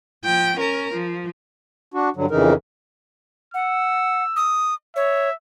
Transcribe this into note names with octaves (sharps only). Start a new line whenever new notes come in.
F3 G5
C#4 A#4
F3
D4 F#4
G2 D3 F#3
F2 C#3 E3 D#4 A#4
F#5 E6
D#6
C#5 E5